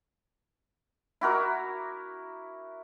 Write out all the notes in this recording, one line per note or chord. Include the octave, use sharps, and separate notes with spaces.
E4 F#4 A#4 D6